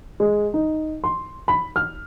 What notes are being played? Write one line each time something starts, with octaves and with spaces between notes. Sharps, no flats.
G#3
D#4
C6
B5
F6